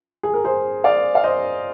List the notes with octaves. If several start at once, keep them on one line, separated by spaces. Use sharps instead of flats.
G#4
A#4
G#4 C5
D5 F5
F5
C5 D#5